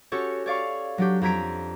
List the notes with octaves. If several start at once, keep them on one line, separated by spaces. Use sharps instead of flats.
C#4 F#4 G4 A4 C#5
C#5 D5 F5 C#6
F#3 D4 G4
F2 G4 A#5 G#6 B6 D7